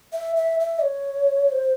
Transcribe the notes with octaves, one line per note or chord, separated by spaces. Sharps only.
E5
E5
E5
C#5
C5